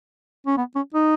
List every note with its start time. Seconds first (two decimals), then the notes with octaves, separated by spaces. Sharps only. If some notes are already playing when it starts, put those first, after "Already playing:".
0.47 C#4
0.57 B3
0.75 C#4
0.94 D#4